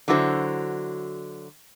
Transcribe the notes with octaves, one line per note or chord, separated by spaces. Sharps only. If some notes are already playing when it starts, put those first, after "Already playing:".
D3 F#3 E4 F#4 B4 C5